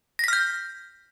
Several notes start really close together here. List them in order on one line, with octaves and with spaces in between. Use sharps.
A#6 B6 F6 G6